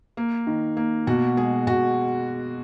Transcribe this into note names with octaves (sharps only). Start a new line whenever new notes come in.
A#3
D#3
A#3
B2 F#4
G#3 G#4
B2 F#4